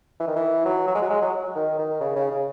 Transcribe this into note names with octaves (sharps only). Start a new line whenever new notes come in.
E3
D#3
E3
F#3
F#3
G#3
F#3
G#3
F#3
D#3
D#3
C#3
C#3
C#3